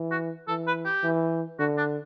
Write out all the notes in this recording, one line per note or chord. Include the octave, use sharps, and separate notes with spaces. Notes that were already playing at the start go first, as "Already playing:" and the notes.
Already playing: E3
F#4
E3 A4
B4
G4
E3
D3 F#4
D4